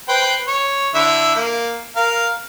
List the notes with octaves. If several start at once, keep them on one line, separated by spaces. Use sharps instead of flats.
B4 C5 G5
C#5
D3 E4 E5
A#3
A#4 F5